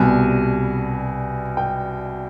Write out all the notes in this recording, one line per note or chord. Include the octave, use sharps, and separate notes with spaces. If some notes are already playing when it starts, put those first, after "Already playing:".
Already playing: C2 B2 G3 G#5
G5